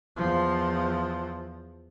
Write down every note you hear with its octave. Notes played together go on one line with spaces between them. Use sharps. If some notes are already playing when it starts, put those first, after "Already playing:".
E2 F3